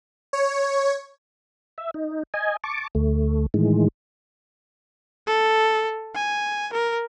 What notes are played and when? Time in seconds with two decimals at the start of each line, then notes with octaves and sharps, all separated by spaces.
0.33 C#5
1.78 E5
1.94 D#4
2.34 D#5 G#5
2.64 A5 C#6 D6
2.95 D2 A3
3.54 A2 D#3 E3 G#3
5.27 A4
6.14 G#5
6.73 A#4